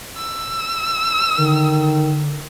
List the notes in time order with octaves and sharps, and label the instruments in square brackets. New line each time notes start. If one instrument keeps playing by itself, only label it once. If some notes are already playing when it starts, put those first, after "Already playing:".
[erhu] E6
[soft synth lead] D3 [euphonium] D#3